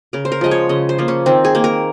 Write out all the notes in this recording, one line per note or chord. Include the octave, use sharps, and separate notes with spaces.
C#3 A#4
C5
A#4
F3 G#3 D#5
C#5
C#3 D#5
C5
F3 A#3
C#4
D#3 C4
G#4
A#3
A#4